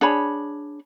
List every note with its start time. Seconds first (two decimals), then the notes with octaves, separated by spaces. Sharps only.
0.01 D4 G#4 C#5 B5